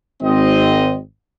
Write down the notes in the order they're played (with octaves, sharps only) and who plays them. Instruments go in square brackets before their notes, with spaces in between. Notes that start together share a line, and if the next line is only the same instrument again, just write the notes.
[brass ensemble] G#1 C4 D#5